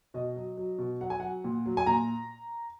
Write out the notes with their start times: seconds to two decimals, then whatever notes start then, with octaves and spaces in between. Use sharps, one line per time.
0.14 B2 D#5
0.36 F#3
0.57 F#3
0.78 B2
1.01 F#3 F#5
1.10 G#5
1.20 F#3 F#5
1.44 A#2
1.66 F#3
1.77 G#5
1.87 A#2 A#5